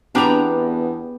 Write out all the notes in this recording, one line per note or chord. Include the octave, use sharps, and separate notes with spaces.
E2 B3 C4 D4 G4 A#5